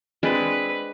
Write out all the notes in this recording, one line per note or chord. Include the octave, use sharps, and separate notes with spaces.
G#3 C4 D4 B4